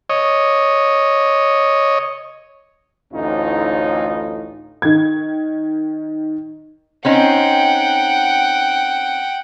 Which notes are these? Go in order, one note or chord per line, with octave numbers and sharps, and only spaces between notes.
C#5 D#5
A1 D2 A2 C#4 D#4 F4
D#3 G#6
C4 C#4 D#4 F#5 G5